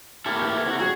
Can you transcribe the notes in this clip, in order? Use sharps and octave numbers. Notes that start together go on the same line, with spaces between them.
A#3 E4 G4 A4
E3 G4
C3 F#4
F2 G3 F#4 G#4